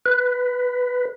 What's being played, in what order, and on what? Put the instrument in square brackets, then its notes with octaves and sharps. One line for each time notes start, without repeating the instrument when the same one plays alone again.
[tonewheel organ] B4